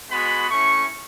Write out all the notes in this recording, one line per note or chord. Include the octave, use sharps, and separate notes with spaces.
G#3 B3 F#4 B5
A3 C#4 E4 C#6